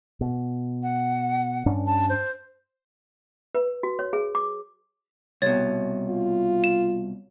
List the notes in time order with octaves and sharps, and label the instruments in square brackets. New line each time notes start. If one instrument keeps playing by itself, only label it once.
[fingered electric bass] B2
[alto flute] F#5
[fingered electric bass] G2 C#4 D4
[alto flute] A5
C5
[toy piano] B4
F#4
C#5
G#4
D6
[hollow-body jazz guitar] C2 B2 [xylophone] C#5 A6
[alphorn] F4
[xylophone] E7